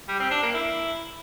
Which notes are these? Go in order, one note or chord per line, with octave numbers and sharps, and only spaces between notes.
G3
C4
D4
A#3
E4